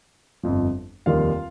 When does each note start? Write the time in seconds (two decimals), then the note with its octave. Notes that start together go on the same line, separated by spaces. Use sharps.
0.43 G1 F2 F3
1.06 F1 D#2 D#3 G3 F4 F5